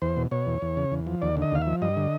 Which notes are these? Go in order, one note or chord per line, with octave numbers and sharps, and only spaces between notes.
E2 C5
B2
B2 C#5
E2
E2
C#3
E2
F3
D#2 D5
D3
D#5
D#2 F5
E5
F3
G2 D#5
D3